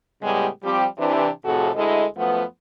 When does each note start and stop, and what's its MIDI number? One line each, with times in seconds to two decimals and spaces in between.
0.23 0.48 45
0.23 0.48 49
0.23 0.48 55
0.23 0.48 56
0.23 0.48 59
0.23 0.48 67
0.64 0.86 53
0.64 0.86 55
0.64 0.86 60
0.64 0.86 67
0.99 1.28 48
0.99 1.28 52
0.99 1.28 62
1.45 1.70 41
1.45 1.70 45
1.45 1.70 48
1.45 1.70 66
1.45 1.70 68
1.45 1.70 69
1.76 2.06 38
1.76 2.06 56
1.76 2.06 64
1.76 2.06 69
1.76 2.06 75
2.18 2.44 42
2.18 2.44 53
2.18 2.44 57
2.18 2.44 59